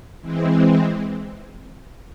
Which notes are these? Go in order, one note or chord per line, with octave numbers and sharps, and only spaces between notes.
E3 G#3 C4